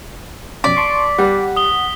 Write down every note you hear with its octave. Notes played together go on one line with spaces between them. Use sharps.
F2 B2 C#4 D5 B6
A5 C6 C#6
G3 F#5
D#6 G7